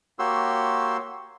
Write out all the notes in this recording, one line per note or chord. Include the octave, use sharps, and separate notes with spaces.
A#3 F#4 G4 C#5 C6 E6